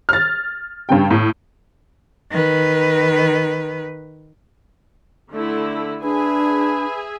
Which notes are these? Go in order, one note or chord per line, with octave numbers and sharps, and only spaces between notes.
F6 A6
G2 C#3 G5
A2
D#3 B4
D3 A3 E4
D4 G#4 B4 E5 G#5